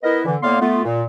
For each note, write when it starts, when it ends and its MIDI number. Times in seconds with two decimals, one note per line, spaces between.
0.03 0.21 59
0.03 0.21 64
0.03 0.21 70
0.03 0.21 71
0.03 0.21 75
0.26 0.36 50
0.26 0.36 52
0.42 0.59 45
0.42 0.59 58
0.42 0.59 59
0.42 0.59 74
0.42 0.59 77
0.42 0.59 84
0.61 0.81 57
0.61 0.81 59
0.61 0.81 65
0.84 1.04 46